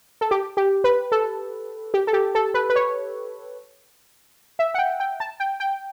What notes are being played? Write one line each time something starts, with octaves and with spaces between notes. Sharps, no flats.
A4
G4
G4
B4
A4
G4
A4
G4
A4
B4
B4
C#5
E5
F#5
G5
G5
A5
G5
G5